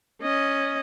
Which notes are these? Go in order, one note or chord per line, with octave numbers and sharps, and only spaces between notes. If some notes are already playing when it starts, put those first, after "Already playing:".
C#4 D#5